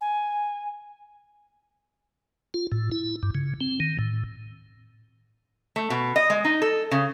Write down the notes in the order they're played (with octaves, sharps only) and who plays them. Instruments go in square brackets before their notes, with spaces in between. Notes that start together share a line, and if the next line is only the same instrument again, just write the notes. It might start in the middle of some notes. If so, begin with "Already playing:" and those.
[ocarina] G#5
[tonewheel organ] F4
A2
E4
G2
C#3
C4
D#3
A2
[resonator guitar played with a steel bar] A3
B2
D#5
G#3
D#4
A4
C#3